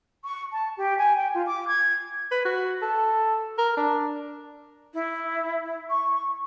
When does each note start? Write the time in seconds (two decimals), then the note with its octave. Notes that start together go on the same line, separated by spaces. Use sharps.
0.25 C#6
0.52 A5
0.77 G4
0.98 G#5
1.17 G5
1.34 F4
1.46 D6
1.68 G#6
2.31 B4
2.45 F#4
2.82 A4
3.58 A#4
3.77 D4
4.93 E4
5.89 C#6